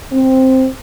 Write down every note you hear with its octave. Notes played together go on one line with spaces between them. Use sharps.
C4